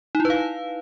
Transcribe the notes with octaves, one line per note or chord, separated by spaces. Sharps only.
D#4
E4
B4
F5